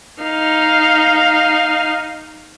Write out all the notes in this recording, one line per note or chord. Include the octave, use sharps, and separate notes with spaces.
D#4 F5